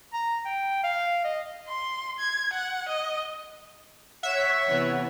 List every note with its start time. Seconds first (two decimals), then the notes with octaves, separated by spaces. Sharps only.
0.13 A#5
0.45 G5
0.84 F5
1.24 D#5
1.67 C6
2.19 G#6
2.53 F#5
2.88 D#5
4.23 C#5 E5 F#5
4.68 C3 E3 B3 F#5